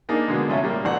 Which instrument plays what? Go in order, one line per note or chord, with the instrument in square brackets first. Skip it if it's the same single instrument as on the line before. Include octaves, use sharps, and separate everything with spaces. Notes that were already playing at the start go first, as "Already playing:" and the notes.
[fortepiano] A#3 D4 D#4 G#4
B2 D3 G#3
C3 A3 C#4 E4 F4
A#2 G3 A#3
A1 F#5